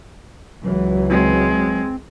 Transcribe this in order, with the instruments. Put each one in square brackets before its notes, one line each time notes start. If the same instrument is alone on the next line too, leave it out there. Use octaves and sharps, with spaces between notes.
[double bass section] C#2 E3 [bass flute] F#3
[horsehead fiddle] G#3 [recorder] C4